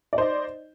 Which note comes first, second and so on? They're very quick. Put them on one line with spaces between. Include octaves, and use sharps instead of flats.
D5 D#4 C5 D#5